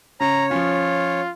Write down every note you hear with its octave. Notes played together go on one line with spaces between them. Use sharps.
C#3 C#5 A#5
F3 C#4 F4